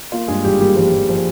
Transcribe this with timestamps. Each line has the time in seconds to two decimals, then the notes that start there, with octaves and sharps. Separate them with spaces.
0.12 A#3 F4
0.28 G2 G#3 G#4
0.44 G#1 G3 G4
0.60 G3 A#3 G4
0.76 F3 G3 G4
0.92 F3
1.09 F3